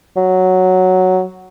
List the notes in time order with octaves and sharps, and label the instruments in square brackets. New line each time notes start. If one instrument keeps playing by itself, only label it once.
[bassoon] F#3